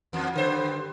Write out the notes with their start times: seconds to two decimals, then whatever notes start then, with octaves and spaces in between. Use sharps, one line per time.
0.13 E2
0.34 G2 D3 C5